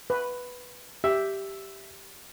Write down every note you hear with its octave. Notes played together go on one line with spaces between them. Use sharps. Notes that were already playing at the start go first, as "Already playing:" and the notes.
B4
G4 E5